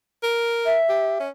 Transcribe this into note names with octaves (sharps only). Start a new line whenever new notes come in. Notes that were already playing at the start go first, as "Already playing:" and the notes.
A#4
E5
G4
C#4